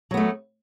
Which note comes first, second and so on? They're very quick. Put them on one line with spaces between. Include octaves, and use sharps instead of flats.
F#3 B3 A3